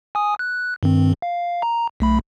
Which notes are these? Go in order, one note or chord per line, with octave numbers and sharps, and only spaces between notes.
G#5 D#6
F#6
G2 D#3 C4
F5
A#5
B1 A3 B5